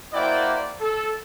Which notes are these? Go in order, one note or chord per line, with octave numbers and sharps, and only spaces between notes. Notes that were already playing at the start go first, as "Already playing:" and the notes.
A#3 E4 F#4 C5 D5 G5
A4